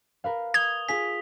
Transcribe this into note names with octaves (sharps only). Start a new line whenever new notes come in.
A#4 B4 F5
D#6 G#6 F7 G7
F4 G#4 G#5 B6